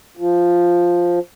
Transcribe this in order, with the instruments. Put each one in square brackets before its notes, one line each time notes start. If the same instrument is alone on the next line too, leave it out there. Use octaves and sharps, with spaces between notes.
[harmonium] F3